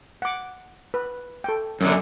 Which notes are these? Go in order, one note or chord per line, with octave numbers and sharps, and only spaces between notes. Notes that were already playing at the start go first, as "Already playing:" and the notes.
F#5 D6
B4
A4 G5
F#2 D3